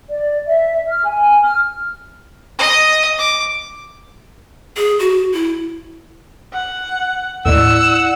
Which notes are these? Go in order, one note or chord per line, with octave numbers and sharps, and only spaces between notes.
D5
E5
F6
G#5
F6
D#5
D6
G#4
F#4
E4
F#5
D#2 A2 E4 D5 F#5 E6